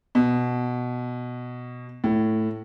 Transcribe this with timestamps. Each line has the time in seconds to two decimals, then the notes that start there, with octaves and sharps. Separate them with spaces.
0.15 B2
2.04 A2